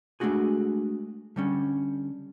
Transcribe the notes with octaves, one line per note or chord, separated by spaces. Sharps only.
G#3 A3 B3 D4 F#4 G#4
D3 G3 C#4